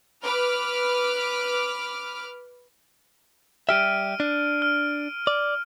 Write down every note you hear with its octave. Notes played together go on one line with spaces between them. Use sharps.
B4 D6 F6
G3 G4 E5 F6 D7 D#7
D4
F6
D5